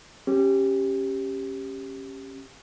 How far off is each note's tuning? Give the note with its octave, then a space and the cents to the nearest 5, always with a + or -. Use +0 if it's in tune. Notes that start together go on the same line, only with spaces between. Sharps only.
C#4 -20 G4 +0